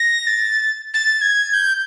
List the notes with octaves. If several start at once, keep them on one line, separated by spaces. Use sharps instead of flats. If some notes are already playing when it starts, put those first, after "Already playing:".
Already playing: A#6
A6
A6
G#6
G#6
G6